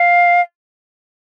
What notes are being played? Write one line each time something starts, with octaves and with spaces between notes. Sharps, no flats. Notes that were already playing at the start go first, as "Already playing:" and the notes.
Already playing: F5